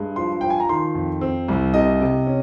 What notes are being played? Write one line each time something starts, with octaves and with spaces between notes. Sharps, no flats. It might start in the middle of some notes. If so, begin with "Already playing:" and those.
Already playing: G2 G#3
F3 C6
F3 G5
G#5
A#5
D#3 C6
F2
C4
C2
C3 D#5
C3
C#4